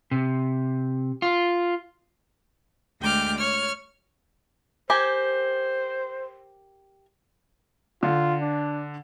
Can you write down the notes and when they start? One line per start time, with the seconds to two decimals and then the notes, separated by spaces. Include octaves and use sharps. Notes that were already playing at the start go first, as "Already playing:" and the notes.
0.11 C3
1.22 F4
3.00 D2 G#3 G5 D6 F6
3.36 C#5 F6
4.90 G4 A#4 C5 G#5
8.03 D3 F4
8.41 D4